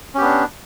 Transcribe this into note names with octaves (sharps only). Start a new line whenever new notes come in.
B3 C#4 D4 G4